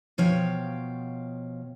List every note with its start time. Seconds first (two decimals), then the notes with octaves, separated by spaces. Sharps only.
0.18 B2 F3 C#5 F5 G5